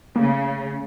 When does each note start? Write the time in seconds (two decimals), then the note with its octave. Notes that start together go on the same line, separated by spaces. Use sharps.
0.16 C#3 A3 A#3